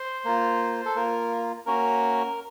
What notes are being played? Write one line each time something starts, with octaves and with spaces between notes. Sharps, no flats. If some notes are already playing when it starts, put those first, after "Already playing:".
Already playing: C5
A#3 F4
A4
A#3 F4 A#4
A#3 C#4 F#4 A#4